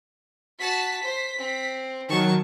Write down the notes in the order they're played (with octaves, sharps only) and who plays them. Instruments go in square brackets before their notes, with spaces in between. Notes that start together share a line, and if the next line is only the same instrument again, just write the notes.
[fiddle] F#4 A5 [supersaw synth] B6
[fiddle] C5
C4
[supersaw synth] D#3 F#3 [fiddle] A5 C#6